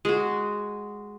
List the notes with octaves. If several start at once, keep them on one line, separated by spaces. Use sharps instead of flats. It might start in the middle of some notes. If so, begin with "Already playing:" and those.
G#3 F#4